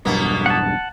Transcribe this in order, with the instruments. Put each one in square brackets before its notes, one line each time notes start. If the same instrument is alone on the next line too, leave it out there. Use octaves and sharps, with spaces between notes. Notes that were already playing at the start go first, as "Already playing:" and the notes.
[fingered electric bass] E1 B1 G2 [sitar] B2 A#3 B3
[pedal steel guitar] F#5 A5